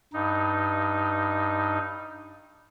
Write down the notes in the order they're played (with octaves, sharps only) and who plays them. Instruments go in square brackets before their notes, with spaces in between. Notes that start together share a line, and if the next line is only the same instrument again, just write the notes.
[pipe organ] G2 D#4